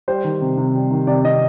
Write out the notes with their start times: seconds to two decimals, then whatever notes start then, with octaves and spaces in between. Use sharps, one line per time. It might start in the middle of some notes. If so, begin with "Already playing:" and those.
0.08 G3 C5
0.24 D#3
0.41 C3
0.57 C3
0.75 G3
0.91 D#3
1.07 C3 D5
1.25 C3 D#5